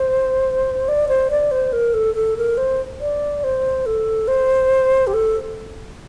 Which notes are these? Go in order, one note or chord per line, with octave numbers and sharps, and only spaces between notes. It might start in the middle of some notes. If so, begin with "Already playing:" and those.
Already playing: C5
D5
C5
D5
C5
A#4
A4
A4
A#4
C5
D5
C5
A4
C5
G4
A4